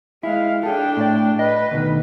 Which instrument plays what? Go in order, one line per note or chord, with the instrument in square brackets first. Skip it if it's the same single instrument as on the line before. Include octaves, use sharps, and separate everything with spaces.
[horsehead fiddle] G#3 F5 [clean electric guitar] E4
[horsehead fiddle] D4 G5 [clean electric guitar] G#4 A4
[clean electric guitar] A2 D5
[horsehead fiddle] B4 [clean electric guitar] D#5
[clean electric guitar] D2 B2 D#3